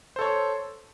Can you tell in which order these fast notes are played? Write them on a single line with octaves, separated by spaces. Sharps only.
C5 A4 C#5